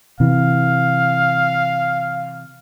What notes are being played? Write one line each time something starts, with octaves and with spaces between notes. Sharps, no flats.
C3 E3 F5